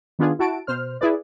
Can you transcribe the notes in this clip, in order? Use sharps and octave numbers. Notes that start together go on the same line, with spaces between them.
D#3 B3 D4 F4 G#4
E4 F#4 A5 D7
B2 C5 F6
E4 G#4 B4 D5